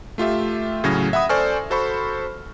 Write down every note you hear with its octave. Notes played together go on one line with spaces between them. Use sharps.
A3 F4 G4 E5
A2 C#3 F#3 C#4 G#6 A#6
E5 F#5 B5 D#6
A4 C5 D5 G#5 C#6 F6
F#4 A4 C5 B5 C#6